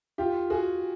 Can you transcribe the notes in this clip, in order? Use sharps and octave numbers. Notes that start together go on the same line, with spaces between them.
F4 G4
F#4 G#4